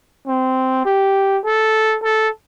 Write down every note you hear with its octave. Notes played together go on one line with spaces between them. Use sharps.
C4
G4
A4
A4